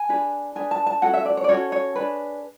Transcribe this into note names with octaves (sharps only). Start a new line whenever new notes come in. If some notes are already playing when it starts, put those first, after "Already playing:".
Already playing: G#5
D4 G#4 B4
D4 G#4 B4 G#5
A5
A5
C#4 F#4 A4 F#5
E5
D5
C#5
D5
C#4 F#4 A4 C#5
C#5
D4 G#4 B4